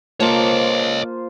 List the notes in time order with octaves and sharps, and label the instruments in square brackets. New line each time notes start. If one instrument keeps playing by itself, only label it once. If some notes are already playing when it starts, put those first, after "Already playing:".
[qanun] A#3 A5 [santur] F4 C5 [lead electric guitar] C#5 D#5